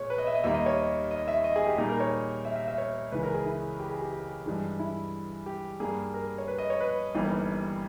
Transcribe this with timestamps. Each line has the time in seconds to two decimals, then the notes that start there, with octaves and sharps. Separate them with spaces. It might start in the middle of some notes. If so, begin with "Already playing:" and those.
Already playing: A#2 G#3 C#5
0.10 B4
0.18 D#5
0.27 E5
0.35 D#5
0.44 D#2 D#3 G3 A#3 E5
0.54 D#5
0.66 C#5
0.77 D#5
1.11 D#5
1.28 E5
1.44 D#5
1.56 G#4
1.66 G4
1.78 A#2 G3 A#3 D#4 G#4
1.89 A#4
2.00 C#5
2.45 E5
2.56 E5
2.68 E5
2.78 C#5
3.12 C#2 C#3 E3 B4
3.23 A#4
3.34 G#4
3.46 E4
3.79 G4
3.90 G#4
4.01 G4
4.12 G4
4.46 G2 E3 G#3
4.79 E4
5.46 G4
5.80 G2 G3 A#3 G#4
6.14 A#4
6.38 C#5
6.48 B4
6.58 D#5
6.70 C#5
6.80 B4
7.15 G1 G2 E3 A#3 D#4